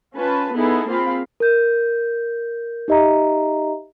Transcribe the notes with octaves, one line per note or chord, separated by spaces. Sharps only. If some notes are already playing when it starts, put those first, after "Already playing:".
C#4 F4 B4 A5
B3 D#4 E4 G#4 A4
A#3 C4 F4 G#4 F5 B5
A#4 G6
D#4 G4 D#5 E5 A#5